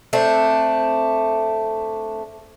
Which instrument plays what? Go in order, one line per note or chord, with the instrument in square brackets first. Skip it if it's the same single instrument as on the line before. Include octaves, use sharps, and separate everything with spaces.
[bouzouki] A3 C4 D4